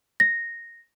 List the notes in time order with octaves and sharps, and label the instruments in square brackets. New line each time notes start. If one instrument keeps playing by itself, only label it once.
[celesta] A#6